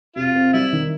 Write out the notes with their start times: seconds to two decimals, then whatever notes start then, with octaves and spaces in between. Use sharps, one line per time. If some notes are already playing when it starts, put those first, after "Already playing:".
0.16 C3 F4
0.35 C4
0.53 G3 E4
0.73 D#3